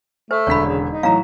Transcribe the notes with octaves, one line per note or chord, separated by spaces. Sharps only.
A3 C5
E1 D3 C#5 B5 B6
C#3
D#4
A2 E3 F#3 F5 A#5